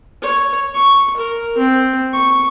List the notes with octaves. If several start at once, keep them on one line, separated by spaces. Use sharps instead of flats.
C#5
C#6
A#4
C4
C#6